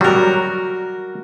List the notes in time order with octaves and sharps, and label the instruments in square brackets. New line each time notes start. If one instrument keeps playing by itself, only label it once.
[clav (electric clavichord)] F#3 G3 [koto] F#4 A#4